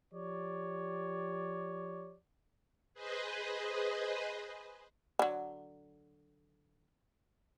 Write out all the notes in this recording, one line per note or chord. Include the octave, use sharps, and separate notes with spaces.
F3 G4 C#5 D5
G#4 B4 C5 D#5
D3 F#3